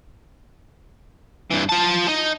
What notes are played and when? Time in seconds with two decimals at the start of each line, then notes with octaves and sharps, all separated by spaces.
1.51 G2 E3
1.69 F4 A5
2.08 D#4